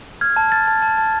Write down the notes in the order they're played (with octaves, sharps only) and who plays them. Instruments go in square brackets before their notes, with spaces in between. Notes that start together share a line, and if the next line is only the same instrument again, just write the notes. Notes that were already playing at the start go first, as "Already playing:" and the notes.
[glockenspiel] F6 G#6
A5
F6 A6
A5
A5
A5